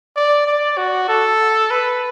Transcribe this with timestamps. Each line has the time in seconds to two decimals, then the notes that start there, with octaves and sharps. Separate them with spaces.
0.16 D5
0.47 D5
0.77 F#4
1.09 A4
1.70 B4